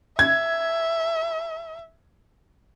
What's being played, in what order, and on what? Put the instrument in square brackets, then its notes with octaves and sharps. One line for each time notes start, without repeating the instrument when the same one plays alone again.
[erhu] E5 [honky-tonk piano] G#6